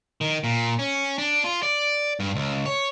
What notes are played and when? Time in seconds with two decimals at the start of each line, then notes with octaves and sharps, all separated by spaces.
0.21 D#3
0.44 A#2
0.79 C#4
1.18 D4
1.44 F4
1.63 D5
2.20 G2
2.35 C#2
2.66 C#5